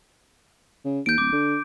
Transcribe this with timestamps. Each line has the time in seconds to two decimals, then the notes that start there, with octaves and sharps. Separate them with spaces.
0.85 C#3
1.06 D#2 G6 D7
1.18 D1 D6
1.32 D3